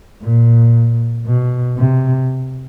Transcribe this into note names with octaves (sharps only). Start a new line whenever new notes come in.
A#2
B2
C3